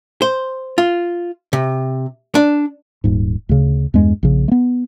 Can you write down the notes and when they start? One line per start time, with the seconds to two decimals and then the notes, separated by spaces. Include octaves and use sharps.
0.22 C5
0.78 F4
1.53 C3
2.35 D4
3.04 D#1 G#2
3.49 D2 C#3
3.94 E2 G2 G#3
4.23 A#1 C#3
4.48 A3 B3